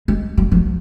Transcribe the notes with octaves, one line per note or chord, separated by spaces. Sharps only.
G#3
F#3
F3